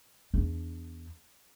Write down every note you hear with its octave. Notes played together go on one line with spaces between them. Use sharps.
E2 D4